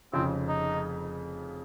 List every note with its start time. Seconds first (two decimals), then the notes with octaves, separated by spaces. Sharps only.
0.13 F1 F2 C#3 C4
0.48 D#4